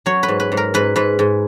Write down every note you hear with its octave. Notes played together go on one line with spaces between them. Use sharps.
F#3 C#5
B4
G#2
B4
G#2
A#4
G#2 B4
G#2 B4
G#2